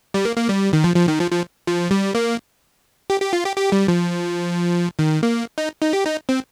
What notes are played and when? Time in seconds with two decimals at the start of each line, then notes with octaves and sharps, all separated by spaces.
0.14 G3
0.25 A#3
0.37 A#3
0.49 G3
0.73 D#3
0.84 F3
0.96 F3
1.08 D#3
1.20 F3
1.31 F3
1.67 F3
1.91 G3
2.15 A#3
3.10 G4
3.21 G4
3.33 F4
3.45 G4
3.56 G4
3.72 G3
3.88 F3
4.99 D#3
5.23 A#3
5.58 D#4
5.82 D#4
5.93 G4
6.06 D#4
6.29 C4